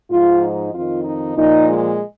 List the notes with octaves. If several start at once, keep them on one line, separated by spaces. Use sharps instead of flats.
G#2 F3 F4
D#4
F2 D#3 F4
D#4
A#2 F3 D#4
G#3